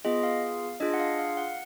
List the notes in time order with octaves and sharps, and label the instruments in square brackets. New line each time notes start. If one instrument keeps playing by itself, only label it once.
[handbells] B3 F4 G#4 D#5
F5
D4 F4 G#4 D#5
F#5
F5
F5
F#5